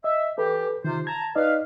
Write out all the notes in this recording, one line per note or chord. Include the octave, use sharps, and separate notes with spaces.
D#5 E5
E3 G4 A4 B4
C3 D#3 F4 C5
A5 A#5 G#6
D#4 B4 D5 D#5 F5